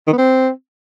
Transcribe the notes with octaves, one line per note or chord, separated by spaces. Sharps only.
D#3
B3
C4